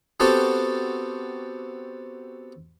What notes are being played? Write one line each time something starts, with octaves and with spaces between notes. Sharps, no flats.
B3 C4 F#4 G4 A4